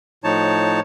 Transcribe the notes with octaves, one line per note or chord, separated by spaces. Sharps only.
A2 F3 D#4 C#5 A5